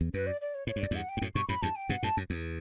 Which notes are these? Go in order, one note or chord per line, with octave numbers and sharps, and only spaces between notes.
E2
F#2 B4
D5
D5
C#5
A2 C#5
G2
F#2 D5
E2 G2 F#5
G5
G2
F#2 A2
G2 B2 C#6
F#2 A2 B5
E2 G2 A5
G5
G2 B2 F#5
F#2 A2 A5
F#2
E2